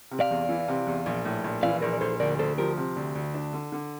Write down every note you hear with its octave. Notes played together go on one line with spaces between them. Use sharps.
C3
D5 F5
E2
E3
C3
E2
A#1
A2
A#1
E3 D5 F5
A#1 A#4 D5
D5
A#1 A4 C5
D2 A#4 D5
D2 A4 C5
F3 G4 A#4
C3
D2
D2
D4
D3
D3